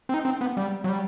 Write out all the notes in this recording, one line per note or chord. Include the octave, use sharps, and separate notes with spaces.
C4
D#4
C4
B3
G3
F#3
G3